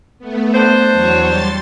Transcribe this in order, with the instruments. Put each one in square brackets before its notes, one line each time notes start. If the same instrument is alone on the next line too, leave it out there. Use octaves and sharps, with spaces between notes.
[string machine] A3 B3
[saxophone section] D4 C5
[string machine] E2 F#3 C#5
G3 C6 A6